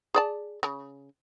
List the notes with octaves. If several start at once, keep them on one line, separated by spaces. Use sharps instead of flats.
G#4 D5 A5
C#3